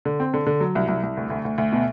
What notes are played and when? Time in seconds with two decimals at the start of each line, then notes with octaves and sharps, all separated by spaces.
0.05 D3
0.20 C4
0.34 D3
0.47 D3
0.60 F#3
0.75 C2
0.88 C2
1.03 C2
1.17 D2
1.30 D2
1.45 D2
1.58 D2
1.72 B2